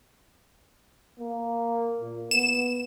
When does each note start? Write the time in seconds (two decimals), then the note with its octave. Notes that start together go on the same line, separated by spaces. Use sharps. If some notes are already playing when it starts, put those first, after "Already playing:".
1.19 A#3
2.00 A#2
2.31 B3 E7